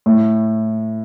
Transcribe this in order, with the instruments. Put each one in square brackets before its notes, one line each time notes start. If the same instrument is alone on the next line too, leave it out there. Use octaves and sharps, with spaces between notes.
[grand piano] A2